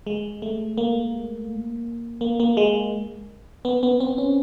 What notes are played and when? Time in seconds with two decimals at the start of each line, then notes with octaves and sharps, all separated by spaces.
0.07 G#3
0.42 A3
0.78 A#3
2.21 A#3
2.40 A#3
2.57 G#3
3.65 B3
3.83 B3
4.00 C4
4.18 C#4